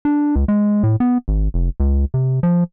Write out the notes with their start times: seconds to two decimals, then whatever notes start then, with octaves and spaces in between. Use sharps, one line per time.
0.05 D4
0.36 C#2
0.48 G#3
0.83 A2
1.00 B3
1.28 G#1
1.54 F1
1.80 C#2
2.14 C3
2.43 F3